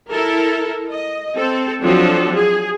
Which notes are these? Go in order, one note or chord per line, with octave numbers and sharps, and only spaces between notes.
E4 A4 A#4
D#5
C4 A4
F3 F#3 C4 D4 F#4 A4
G#4